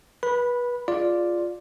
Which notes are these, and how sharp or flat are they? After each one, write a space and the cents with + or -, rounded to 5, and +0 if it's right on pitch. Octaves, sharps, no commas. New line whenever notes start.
B4 -25 B5 -5
F4 +0 G#4 +0 D5 +0